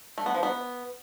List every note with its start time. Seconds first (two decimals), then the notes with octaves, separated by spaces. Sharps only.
0.18 A3
0.26 B3
0.34 F3
0.43 B3